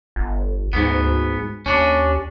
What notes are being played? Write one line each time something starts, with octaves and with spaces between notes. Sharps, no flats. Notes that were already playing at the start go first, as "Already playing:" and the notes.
G1
D2 G#2 B3
D#2 C#4 D4